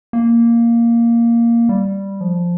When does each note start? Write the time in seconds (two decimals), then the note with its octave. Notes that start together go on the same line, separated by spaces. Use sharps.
0.13 A#3
1.69 G3
2.21 F3